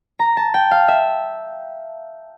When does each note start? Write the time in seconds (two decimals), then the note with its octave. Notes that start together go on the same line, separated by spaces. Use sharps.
0.19 A#5
0.37 A5
0.54 G5
0.71 F5
0.88 E5